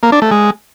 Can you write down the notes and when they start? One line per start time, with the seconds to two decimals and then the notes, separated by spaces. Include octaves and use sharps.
0.03 A#3
0.12 D4
0.22 A3
0.31 G#3